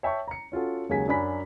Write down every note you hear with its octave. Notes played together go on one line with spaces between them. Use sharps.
C#5 E5 G5 A5 C#6
A#5 C#7
C#4 F4 F#4 A4
D#2 C#3 F#3 G#3 G#5 B6
F#2 F#3 D4 G#5 B5 B6